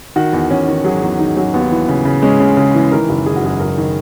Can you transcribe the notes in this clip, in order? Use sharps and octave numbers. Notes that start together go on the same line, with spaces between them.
D#3 F#4
E2
E2 C#4
D#3
F#3 G#4
E2
D#3 D#4
F#3 C#4
D#2 B3
E3
C#3
C#3
G#3 C#4
C#3
C#3
E3
D#3 A#4
F#1
D#3 G#4
F#4
F#2 G#4
F#1 A#4
D#3